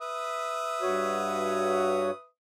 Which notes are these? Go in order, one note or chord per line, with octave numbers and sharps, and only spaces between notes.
B4 E5 D#6
G2 F#4 C#5